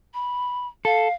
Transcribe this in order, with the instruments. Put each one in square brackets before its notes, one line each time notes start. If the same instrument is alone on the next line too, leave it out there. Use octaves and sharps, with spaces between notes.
[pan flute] B5
[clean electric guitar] A4 [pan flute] F5